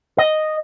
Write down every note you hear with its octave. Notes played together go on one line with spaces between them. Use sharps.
D#5